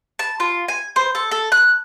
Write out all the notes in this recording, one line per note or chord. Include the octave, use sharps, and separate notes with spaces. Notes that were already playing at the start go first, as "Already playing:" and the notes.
A5
F4
G#5
C5
A4
A4
F#6